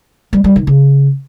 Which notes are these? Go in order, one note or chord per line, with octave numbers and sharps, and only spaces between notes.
G3
G3
D#3
C#3